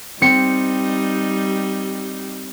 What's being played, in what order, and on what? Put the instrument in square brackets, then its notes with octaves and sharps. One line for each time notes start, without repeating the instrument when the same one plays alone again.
[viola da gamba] G3 D#4 [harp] C4 C#7